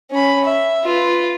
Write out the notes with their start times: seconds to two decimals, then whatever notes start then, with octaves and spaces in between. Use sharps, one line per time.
0.11 C#4 B5
0.45 E5
0.84 F4 B4